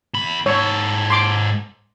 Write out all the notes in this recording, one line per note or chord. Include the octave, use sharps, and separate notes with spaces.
E2 B5
G#2 A4 C#5
C6 D6